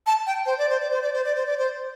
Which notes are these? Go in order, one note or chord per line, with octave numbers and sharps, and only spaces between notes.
A5
G5
C5
D5
C5
D5
C5
D5
C5
D5
C5
D5
C5